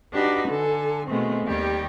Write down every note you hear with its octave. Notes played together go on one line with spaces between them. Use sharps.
D4 D#4 F#4 G4 B4
D3 A4 G#5
B2 D#3 G#3 A3 B3 C4
D#2 D#3 G3 G4